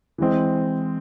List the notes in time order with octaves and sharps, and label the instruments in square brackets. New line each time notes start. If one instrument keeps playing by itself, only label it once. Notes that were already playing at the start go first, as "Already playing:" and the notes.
[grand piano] E3 G#3 C4